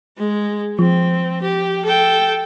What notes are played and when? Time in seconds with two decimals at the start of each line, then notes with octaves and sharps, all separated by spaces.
0.18 G#3
0.79 F3 C4
1.42 G4
1.85 A4 G5